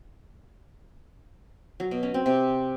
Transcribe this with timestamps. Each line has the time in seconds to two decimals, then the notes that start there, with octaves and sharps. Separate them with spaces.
1.80 F#3
1.91 B2
2.03 C#4
2.14 C4
2.26 C3